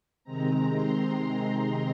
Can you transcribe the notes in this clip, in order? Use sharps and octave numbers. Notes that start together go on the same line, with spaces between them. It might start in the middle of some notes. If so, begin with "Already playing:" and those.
C3 D#3 G#3 C4 A#5
C6
C6